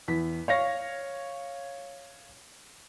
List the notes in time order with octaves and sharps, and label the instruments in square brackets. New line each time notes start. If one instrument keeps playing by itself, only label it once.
[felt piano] E2 B6
C#5 F5 A#6